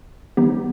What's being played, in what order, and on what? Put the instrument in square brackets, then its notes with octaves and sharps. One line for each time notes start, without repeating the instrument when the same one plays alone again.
[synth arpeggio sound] E3 G3 B3 D#4 G4